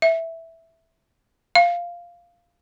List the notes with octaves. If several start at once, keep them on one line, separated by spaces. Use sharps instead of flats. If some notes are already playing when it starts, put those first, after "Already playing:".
E5
F5